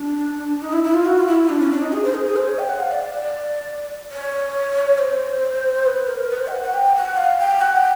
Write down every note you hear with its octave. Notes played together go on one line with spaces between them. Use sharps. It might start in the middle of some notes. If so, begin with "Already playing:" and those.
Already playing: D4
D#4
E4
E4
F4
F#4
F4
E4
D4
C#4
D4
D#4
G#4
C5
G#4
G#4
C5
C#5
G5
F#5
F5
D5
D5
C#5
C5
B4
A#4
B4
C5
G5
F#5
F#5
G5
F#5
F5
G5
F#5
G5